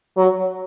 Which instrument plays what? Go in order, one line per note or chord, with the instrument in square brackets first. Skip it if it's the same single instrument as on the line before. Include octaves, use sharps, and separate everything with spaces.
[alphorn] F#3